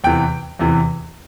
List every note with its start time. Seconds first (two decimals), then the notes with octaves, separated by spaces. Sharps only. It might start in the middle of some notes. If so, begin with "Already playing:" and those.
0.04 E2 C3 E3 G5
0.59 E2 C3 E3